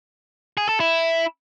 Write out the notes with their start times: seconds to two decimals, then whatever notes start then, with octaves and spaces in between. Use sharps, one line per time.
0.57 G#4
0.69 A4
0.80 E4